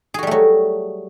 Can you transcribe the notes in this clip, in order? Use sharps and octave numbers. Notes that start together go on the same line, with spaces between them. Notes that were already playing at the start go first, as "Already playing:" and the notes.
F#3 G3 A3 F#4 G#4